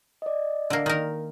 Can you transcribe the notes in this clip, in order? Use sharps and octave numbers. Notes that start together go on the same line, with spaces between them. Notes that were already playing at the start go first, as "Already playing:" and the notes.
D5 D#5
D3 A#3
D#3 A#4